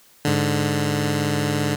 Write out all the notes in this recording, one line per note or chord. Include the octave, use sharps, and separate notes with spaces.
G#2 D3